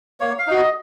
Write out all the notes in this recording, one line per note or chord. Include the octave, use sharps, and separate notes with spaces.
A#3 C#5
F5
D#4 F#4
D#5